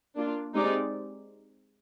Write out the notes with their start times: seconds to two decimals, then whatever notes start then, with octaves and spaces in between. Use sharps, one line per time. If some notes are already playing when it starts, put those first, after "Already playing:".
0.16 A#3 D4 F4
0.55 G#3 C4 D#4 G4 D5